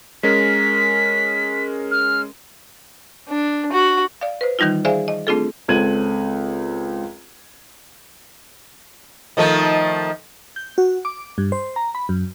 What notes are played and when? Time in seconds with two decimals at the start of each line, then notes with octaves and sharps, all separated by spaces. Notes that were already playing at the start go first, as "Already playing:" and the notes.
0.23 G#3 C#4 A#4 B6
1.91 F6
3.28 D4
3.72 F#4
4.21 D5 F5
4.41 B4 C5
4.59 D#3 E3 G3 D#4 F4
4.85 G#4 C5 D5 E5 F5 G#5
5.08 D#5
5.27 A3 C4 D4 F4 G#4 A4
5.68 C#2 C4 A4 G#6 D#7 F#7
9.37 D#3 F3 A3
10.56 G6
10.78 F#4
11.05 D6
11.38 G2
11.52 C5
11.76 A#5
11.95 B5
12.09 F#2